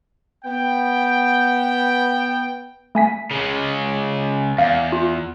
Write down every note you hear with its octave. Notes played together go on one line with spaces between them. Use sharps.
B3 G5
A3 G#5 B6
C#3 G#3
E2 F5
F4